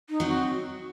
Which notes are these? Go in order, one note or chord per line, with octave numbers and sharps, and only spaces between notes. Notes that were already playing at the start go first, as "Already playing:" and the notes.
D#4
F#3 C4
F#4